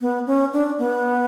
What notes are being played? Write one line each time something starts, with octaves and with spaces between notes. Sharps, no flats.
B3
C#4
D4
B3